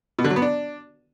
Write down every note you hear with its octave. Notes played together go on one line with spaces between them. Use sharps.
B2
D3
F#3
B3
D4